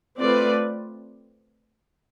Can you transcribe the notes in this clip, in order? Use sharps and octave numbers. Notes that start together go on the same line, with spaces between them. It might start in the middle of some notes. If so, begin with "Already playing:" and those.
A3 C4 F4 B4 D5